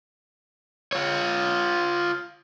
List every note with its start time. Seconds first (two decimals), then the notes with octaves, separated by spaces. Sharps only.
0.93 F4 C#5